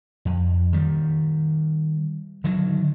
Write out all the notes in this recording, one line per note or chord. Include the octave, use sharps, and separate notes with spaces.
F2
D#3 G3
D3 D#3 F#3